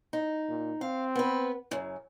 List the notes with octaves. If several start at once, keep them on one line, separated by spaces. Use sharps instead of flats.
D#4
A#2
C4 F5
B3 B4
F#2 C#3